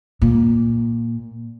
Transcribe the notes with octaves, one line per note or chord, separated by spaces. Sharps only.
A#2